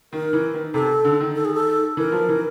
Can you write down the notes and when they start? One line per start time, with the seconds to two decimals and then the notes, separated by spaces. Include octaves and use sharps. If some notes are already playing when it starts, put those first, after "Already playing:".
0.13 D#3 A#4
0.33 E3
0.54 D#3
0.74 C3 A4
1.05 D3
1.21 D#3
1.35 A4
1.45 G#4
1.55 A4
1.97 E3 A#4
2.12 F3
2.29 E3